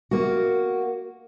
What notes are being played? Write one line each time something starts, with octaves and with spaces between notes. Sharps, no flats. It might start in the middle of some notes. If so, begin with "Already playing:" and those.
A#3 F#4